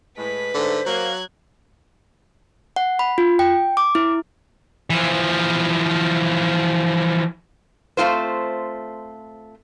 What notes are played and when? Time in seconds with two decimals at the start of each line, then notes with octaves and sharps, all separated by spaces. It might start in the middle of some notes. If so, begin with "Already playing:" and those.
0.17 A2 G#3 B4 B6
0.54 G#2 D3 A3 C5
0.86 F#3 A#3 F#6 G#6
2.76 F#5
2.99 B5
3.18 F4
3.39 G5
3.77 D6
3.95 E4
4.90 E3 F3
7.97 A3 C4 F4 C5